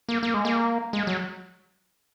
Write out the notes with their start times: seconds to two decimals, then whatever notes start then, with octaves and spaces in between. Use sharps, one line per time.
0.08 A#3
0.23 A#3
0.34 G#3
0.45 A#3
0.93 G#3
1.07 F#3